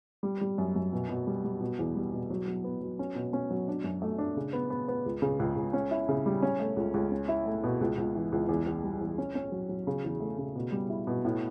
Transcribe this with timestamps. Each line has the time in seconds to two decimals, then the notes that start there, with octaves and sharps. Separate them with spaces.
0.23 G3
0.41 G3
0.58 F#2
0.76 F#2
0.93 B2
1.09 B2
1.27 G3
1.44 G3
1.61 B2
1.79 E2
1.95 G3
2.13 B2
2.30 F#3
2.48 F#3
2.64 B3
2.82 F#3
2.99 C#4
3.15 B2
3.33 C#4
3.51 F#3
3.68 D4
3.84 F#2
4.02 A3
4.18 D4
4.37 C#3
4.53 B3
4.70 B3
4.88 B3
5.06 C#2
5.22 C#3
5.40 C#2
5.56 C#2
5.73 C#4
5.91 E4
6.09 C#3
6.26 G3
6.42 C#4
6.60 A3
6.77 C#2
6.94 C#2
7.11 C#4
7.28 E4
7.46 A3
7.64 B2
7.81 C#2
7.98 C#2
8.15 E3
8.32 C#2
8.49 E2
8.67 E2
8.83 G3
9.01 E2
9.18 C#4
9.35 C#4
9.52 F#3
9.69 F#3
9.87 C#3
10.04 E2
10.20 A3
10.38 C#3
10.55 B2
10.72 G3
10.90 E4
11.07 B2
11.25 A2